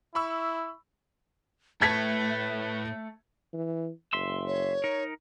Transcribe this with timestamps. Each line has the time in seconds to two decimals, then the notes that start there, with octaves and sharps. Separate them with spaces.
0.15 E4 B5 C#6 E6
1.81 A2 A3 B4 A5 G#6 B6
3.53 E3
4.13 F#1 E5 C6 E6
4.46 C#5
4.84 D#4 A#4